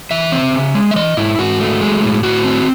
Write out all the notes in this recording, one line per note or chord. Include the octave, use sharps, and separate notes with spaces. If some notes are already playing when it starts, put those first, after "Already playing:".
E3 E5
C4
C#3
G#3
E5
E3 D#5
G#2 E4
G#2 F#4
A3
G#3
A2
A2 F#4
C4